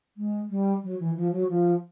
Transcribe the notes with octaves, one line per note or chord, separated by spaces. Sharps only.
G#3
G3
F#3
E3
F3
F#3
F3